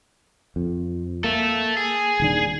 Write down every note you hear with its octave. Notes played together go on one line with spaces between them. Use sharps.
F2
A#3 A4 E5
G#4
D#1 D#3 D4